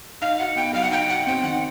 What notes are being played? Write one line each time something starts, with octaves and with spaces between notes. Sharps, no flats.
D#4 F5
F#4 F#5
B3 G5
F#3 F5
F#5
D#4 G5
F#4 F#5
C4 G5
D#3 F#5